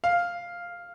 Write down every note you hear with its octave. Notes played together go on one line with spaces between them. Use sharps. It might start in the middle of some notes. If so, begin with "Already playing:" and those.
F5